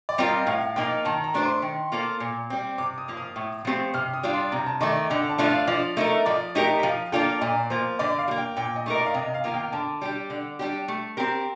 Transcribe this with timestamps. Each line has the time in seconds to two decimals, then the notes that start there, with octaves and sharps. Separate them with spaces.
0.09 D5
0.18 G3 C4 F4 A#4
0.28 D#5
0.47 A2 F5
0.76 F3 A#3 D#4 G5
1.05 D#3 A5
1.24 A#5
1.34 A3 D4 A4 C5
1.44 C6
1.62 D#3
1.92 A#3 F4 A4 C5
2.20 A#2
2.50 G3 C4
2.78 C3 D6
2.98 D#6
3.08 F3 A#3
3.17 D#6
3.36 A2
3.65 F3 A3 C4 G4
3.94 C3 F6
4.14 D#6
4.23 G3 D4 F4
4.33 C6
4.52 C3 A#5
4.66 A5
4.81 D#3 A3 D5
4.96 D#5
5.10 D3 G5
5.29 A5
5.38 F3 A3 D4 F4
5.48 F5
5.67 F3 D5
5.97 A3 D#4 A#4
6.26 F3 D5
6.55 A3 D#4 G4 A#4
6.79 G5
6.83 F3 F5
7.12 A#3 D4 F4 A4 G5
7.41 A#2 D5
7.70 F3 A#3 C5
7.99 D3 D5
8.19 F5
8.28 G3
8.31 A#3
8.38 G5
8.57 A#2 G5
8.76 D#5
8.86 A3 D#4 A#4
8.95 D5
9.06 F5
9.14 C3 D#5
9.34 F5
9.44 D#3 A#3 F4 A#4
9.54 G5
9.72 D3 A5
10.02 G3 D4 G4
10.30 D3
10.59 G3 D4 G4
10.88 A3
11.17 C4 G4 A#4